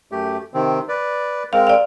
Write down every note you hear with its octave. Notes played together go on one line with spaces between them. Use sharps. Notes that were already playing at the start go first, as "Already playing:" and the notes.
F#2 A3 G4
C3 D#3 C4
B4 D5
G#3 C4 A#4 F5
D5 F5